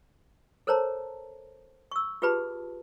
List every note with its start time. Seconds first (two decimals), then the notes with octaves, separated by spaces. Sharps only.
0.67 A4 A#4 C5 C#5 A5 A#5
1.92 C#6 E6
2.22 F4 G4 G#4 B4 A5 B5